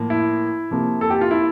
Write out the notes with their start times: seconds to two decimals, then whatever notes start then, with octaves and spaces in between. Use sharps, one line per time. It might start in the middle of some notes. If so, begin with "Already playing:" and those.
Already playing: A2 F3 A#3
0.10 E4
0.71 C3 F3 A#3
1.01 A4
1.10 G4
1.21 F4
1.31 E4